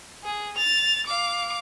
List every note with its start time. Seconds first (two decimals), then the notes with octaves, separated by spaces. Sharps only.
0.24 G#4
0.56 A6 F7
1.06 F5 D6